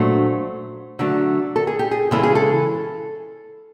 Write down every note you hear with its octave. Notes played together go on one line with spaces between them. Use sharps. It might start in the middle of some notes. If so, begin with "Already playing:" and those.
Already playing: A#2 F#3 A3 D4 C5
D3 F#3 A3
A4
G#4
G4
G#4
C#3 E3 G#3 C#4 E4 A4
G#4
A4